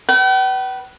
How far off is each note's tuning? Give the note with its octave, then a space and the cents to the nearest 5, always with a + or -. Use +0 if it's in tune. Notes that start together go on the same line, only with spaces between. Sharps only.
B4 -10 G5 -45